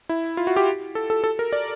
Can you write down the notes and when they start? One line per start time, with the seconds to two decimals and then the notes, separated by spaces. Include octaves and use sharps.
0.09 E4
0.37 F4
0.47 F#4
0.56 G4
0.95 A4
1.10 A4
1.24 A4
1.39 A#4
1.53 D5